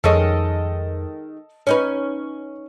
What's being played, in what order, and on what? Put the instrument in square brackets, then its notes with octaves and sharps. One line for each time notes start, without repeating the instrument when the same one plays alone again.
[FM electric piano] F2 [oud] D#3 G#3 C#4 [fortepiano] A4 D#5
[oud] C#4 D#4 B4 [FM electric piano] C#5